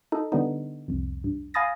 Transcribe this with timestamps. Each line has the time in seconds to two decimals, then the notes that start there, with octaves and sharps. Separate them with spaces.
0.12 D#4 A4
0.32 D3 G3 B3 D#4
0.88 C2 F2
1.24 G2
1.54 F5 G#5 B5 D#6 A6 A#6